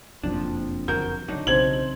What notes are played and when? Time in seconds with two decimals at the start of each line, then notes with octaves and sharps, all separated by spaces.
0.23 F#1 F2 B2 F3 A#3 D4
0.88 D3 F#3 F#4 A#4 G6
1.28 D3 D#3 F#3 D4 D#4
1.47 B1 C#3 E3 C4 G#6 F#7